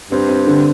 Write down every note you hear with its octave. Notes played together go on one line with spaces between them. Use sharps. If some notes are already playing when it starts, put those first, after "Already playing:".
G2 C4
C4
D3